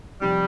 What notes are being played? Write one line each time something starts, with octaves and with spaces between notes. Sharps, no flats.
C3 F3 G3 C4 D#4